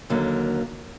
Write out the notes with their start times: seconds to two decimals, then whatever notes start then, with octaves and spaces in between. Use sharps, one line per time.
0.10 D#2 D3 F#3 A#3